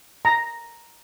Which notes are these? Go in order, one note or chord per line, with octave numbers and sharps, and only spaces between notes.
A#5